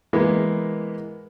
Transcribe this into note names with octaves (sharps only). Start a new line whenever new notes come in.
E3 G#3 A#3 B3